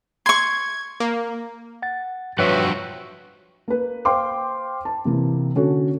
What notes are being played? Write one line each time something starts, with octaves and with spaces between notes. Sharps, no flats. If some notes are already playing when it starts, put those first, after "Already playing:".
C6 C#6 G#6
A#3
F#5 A6
G2 F3 F#4 B4 C#5 E5 F#5
A#3 B4
C5 F5 G5 C6 D6
A5
C3 E3 A#3
D3 C#4 F#4 A4 C#5